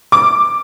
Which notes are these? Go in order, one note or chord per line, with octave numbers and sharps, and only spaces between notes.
D6